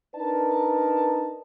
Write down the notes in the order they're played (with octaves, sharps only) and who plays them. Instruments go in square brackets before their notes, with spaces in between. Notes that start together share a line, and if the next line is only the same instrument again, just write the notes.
[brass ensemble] D4 D#4 A#4 B4 D5 A5